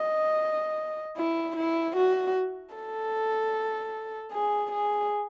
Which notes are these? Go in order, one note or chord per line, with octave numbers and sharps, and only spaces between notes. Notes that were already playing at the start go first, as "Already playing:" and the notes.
Already playing: D#5
E4
E4
F#4
A4
G#4
G#4